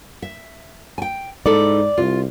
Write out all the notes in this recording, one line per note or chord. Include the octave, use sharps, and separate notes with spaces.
E5
G5 G#5
G#2 D#4 E4 A4 D5
C2 F4